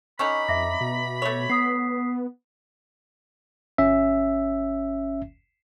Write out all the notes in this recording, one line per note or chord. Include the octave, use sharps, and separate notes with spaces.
D3 C#4 D#4 B5 C#6
F2 E5 D6 A#6
B2
A3 C#5
B3 D#6 B6 C7
G1 C#4 E5